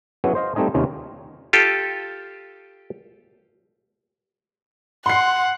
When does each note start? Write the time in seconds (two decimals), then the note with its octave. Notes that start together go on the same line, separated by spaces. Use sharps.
0.24 F#3 B3 C#4 E4 G#4
0.35 C5 D#5 F5
0.55 G3 A3 C4 D#4 D#5 G#5
0.74 D#2 C3 C#4 D#4 F4
1.53 F4 G4 A4
5.06 F#5 C6 C7